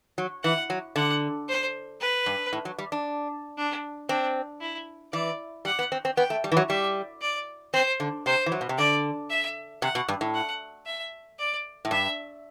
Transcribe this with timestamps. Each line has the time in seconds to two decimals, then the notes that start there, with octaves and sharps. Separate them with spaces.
0.18 F#3
0.44 E3 F#5
0.70 F#3
0.96 D3 F#5
1.48 C5
2.01 B4
2.26 G2
2.53 A2
2.65 F#3
2.78 G3
2.92 D4
3.57 D4
4.09 C4 D4
4.61 E4
5.13 E3 D5
5.65 G3 F#5
5.79 B3
5.92 C4
6.05 C4
6.17 B3 G5
6.30 A3
6.44 G3
6.52 E3
6.57 F#3
6.69 G3 E5
7.22 D5
7.73 C4 C5
8.00 D3
8.26 C3 C5
8.46 E3
8.52 F#3
8.61 B2
8.69 C3
8.78 D3 D5
9.30 E5
9.82 C3 F#5
9.95 B2
10.08 G2
10.21 A2
10.35 F#5
10.86 E5
11.39 D5
11.85 A2
11.91 G2 E5